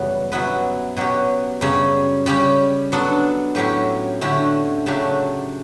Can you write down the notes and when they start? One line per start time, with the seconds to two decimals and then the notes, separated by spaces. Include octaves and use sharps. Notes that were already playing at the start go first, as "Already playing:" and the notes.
Already playing: F#2 C#3 E3 G3 B3
0.32 B2 F#3 B3 E4 B4
0.97 B2 F#3 C#4 G4
1.61 F#2 C#3 G3 C#4
2.26 C#3 G3 C#4 G4
2.92 F#3 B3 D4 A4
3.55 A2 F#3 C#4 E4 G4
4.21 D3 A3 C#4 E4 G4
4.86 C#3 F#3 A3 D4 G4